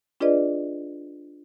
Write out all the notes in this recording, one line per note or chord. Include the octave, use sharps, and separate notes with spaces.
D4 F4 G#4 B4 D5 D#5